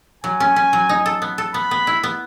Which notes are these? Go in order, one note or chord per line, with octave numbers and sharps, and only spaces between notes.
F#3 G#5
C#4
C#4
F#3
D#4
A4
B3
A4
B3 B5
B3
E4
B3